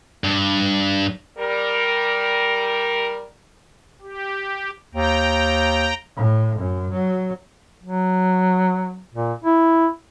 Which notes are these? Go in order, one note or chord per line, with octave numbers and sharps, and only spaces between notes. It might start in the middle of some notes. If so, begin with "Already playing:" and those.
G2
G3 A#4
G4
D#2 G5 A#5
A2
F#2
F#3
F#3
A#2
E4